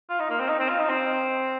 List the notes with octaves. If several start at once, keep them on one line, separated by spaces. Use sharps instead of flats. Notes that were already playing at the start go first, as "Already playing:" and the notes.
F4
D#4
A#3
C4
D#4
C4
F4
D#4
C4